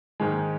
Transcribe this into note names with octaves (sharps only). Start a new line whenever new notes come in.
G#2 D#3 G#3